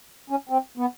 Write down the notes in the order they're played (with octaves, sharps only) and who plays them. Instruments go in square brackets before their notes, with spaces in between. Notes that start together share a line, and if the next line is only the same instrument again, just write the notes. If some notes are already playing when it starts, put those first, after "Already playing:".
[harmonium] C#4
C4
B3